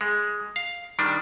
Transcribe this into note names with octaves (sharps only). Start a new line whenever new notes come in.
G#3
F5
D#3 G3 D4